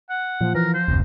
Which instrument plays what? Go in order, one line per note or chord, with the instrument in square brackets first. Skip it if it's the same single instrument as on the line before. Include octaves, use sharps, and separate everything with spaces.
[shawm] F#5
[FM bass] A#2 [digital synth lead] F3
[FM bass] E3 [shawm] A#4
[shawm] C5
[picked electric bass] D1 F2 [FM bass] G1